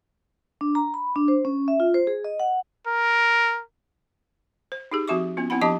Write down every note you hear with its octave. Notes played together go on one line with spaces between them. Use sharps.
D4
A#5
B5
D4
C5
C#4
E5
F4
C5
G#4
D#5
F#5
A#4
C5
D#4 G4 G#4
F3 C4 F#4 E5 C#6 D6
B3 C#4 F4
B3 C4 E4 F#5 B5
F3 D4 G4 D#5 A5 D6